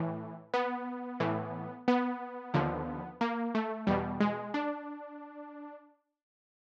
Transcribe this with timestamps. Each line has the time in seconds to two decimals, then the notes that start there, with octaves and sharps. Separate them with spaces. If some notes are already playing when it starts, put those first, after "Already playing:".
Already playing: A2 E3
0.54 B3
1.20 A2 E3
1.88 B3
2.54 D#2 D3 F3
3.21 A#3
3.55 A3
3.87 E2 B2 G3
4.20 G#3
4.54 D4